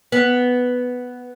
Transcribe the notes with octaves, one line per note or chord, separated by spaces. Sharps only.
B3